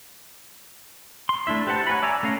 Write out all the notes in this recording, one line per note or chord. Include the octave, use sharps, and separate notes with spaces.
C6
A3 D4 E4 E5
G4 B4 C5 F#5 A5
C#5 F#5 G#5 A#5 B5
D5 E5 G#5 A#5
A3 C#4 F5 A#5